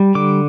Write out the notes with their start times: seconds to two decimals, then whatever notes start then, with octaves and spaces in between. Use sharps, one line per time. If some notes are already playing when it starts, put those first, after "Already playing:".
Already playing: G3
0.15 D3 D6